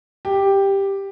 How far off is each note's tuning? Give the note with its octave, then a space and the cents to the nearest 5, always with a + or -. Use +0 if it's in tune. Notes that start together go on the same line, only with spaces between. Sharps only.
G4 +5